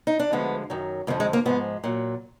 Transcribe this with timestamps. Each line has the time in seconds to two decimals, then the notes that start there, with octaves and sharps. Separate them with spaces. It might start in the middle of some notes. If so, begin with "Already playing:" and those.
0.07 D#4
0.19 D4
0.32 D2 D3 F3 G#3 B3
0.70 F#2 D#3 F#3
1.07 F2 D3 F3 G#3 A#3
1.20 G#3
1.33 A#3
1.45 G#2 F3 G#3 B3
1.84 A#2 F#3